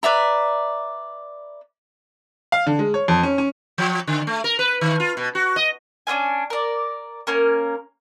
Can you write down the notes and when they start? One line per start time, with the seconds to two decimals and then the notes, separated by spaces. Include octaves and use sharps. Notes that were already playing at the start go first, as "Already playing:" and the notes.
0.03 B4 D5 E5 A#5
2.52 F5
2.67 D3
2.79 G#3
2.94 C#5
3.08 F2
3.23 C#4
3.38 C#4
3.78 F3
4.07 D3
4.27 A3
4.44 A#4
4.59 B4
4.81 D#3
5.00 F4
5.17 B2
5.35 F#4
5.56 D#5
6.07 C#4 D4 F4 G#5
6.50 A#4 D5
7.27 A#3 C#4 A#4